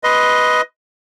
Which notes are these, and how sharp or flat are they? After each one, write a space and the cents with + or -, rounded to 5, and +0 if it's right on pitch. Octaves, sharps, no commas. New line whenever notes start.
B4 +0 D#5 +10 C6 +0